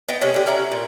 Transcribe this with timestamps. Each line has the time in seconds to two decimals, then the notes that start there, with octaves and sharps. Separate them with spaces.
0.09 B3 D#5 G5
0.21 C3 G#3 C#4 A4
0.34 D3 G4
0.46 C#4 E4 F#4 A#5
0.71 A#2